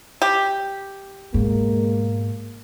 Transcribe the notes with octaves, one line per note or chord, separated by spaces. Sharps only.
G4
G#2 B2 G#3 A#3